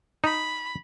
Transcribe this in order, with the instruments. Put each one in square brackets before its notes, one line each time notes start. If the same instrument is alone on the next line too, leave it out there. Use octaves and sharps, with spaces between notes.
[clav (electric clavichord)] D#4 [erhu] B5